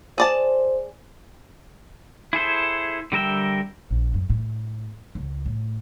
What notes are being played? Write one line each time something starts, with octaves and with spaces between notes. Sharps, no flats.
G#4 C5 D5 A5
E4 G#4 A4 C5
D3 G3 A#4 E5 G5
A#1
F#2
A2
C#2
A2